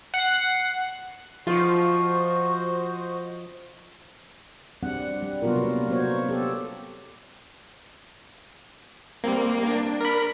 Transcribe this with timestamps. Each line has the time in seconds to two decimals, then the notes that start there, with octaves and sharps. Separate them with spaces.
0.14 F#5 C7
1.47 F3 F4 F#4 C5 D#5 C#6
4.83 G3 C4 D4 F#5
5.22 G3
5.42 C3 F#3 B3 F4 F#4 A#4
5.64 A#3
5.90 F#3 B3 F#4 C5 C#5
6.29 B3 G4 A4
9.24 G3 A#3 C4
9.66 D4
10.01 A#4 B5